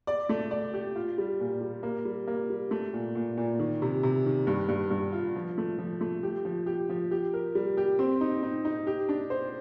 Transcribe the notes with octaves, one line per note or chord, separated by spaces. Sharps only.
D5
A3
D5
G4
F4
G3
A#2
G3
A#3
G3
A#3
G3
A3
A#2
A#2
A#2
D#3
C3
C3
D#3
G2
G2
G2
F4
F3
A3
F3
A3
G4
F3
G4
F3
G4
A#4
G3
G4
C4
D#4
D#4
D#4
G4
D4
C5